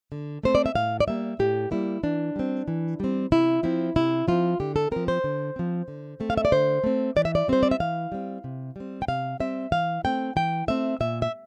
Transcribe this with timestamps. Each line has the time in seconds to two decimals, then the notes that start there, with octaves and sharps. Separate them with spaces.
0.12 D3
0.43 A3 C4 C5
0.55 D5
0.66 E5
0.75 A2 F5
1.00 D5
1.07 G3 A#3 E5
1.39 A2 G4
1.71 G3 A#3 E4
2.03 E3 D4
2.36 G3 C4
2.68 E3
3.00 G3 C4
3.32 C3 E4
3.63 F3 C4 E4
3.96 C3 E4
4.28 F3 C4 F4
4.60 D3 G4
4.76 A4
4.92 F3 C4 A#4
5.08 C5
5.24 D3
5.56 F3 C4
5.88 D3
6.20 A3 C4
6.30 F5
6.38 E5
6.45 D5
6.52 D3 C5
6.84 A3 C4
7.16 E3 D5
7.25 E5
7.35 D5
7.48 G3 C4 C5
7.63 D5
7.71 E5
7.80 E3 F5
8.12 G3 C4
8.44 C3
8.76 G3 C4
9.02 G5
9.08 C3 F5
9.40 G3 C4 E5
9.72 E3 F5
10.04 A3 C4 G5
10.36 E3 G5
10.68 A3 C4 E5
11.00 A#2 E5
11.22 E5